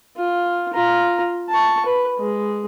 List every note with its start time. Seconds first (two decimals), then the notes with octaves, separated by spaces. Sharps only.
0.17 F4
0.73 F4 A#5
1.49 A5 C#6
1.86 B4
2.18 G#3